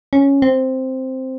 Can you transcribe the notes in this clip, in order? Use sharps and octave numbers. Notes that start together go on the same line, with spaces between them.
C#4
C4